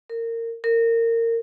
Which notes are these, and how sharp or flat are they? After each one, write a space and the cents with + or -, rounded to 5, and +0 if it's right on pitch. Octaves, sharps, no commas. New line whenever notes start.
A#4 -25
A#4 -25